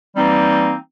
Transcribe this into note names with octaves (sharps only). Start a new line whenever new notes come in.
E3 G3 A#3 C4 D#4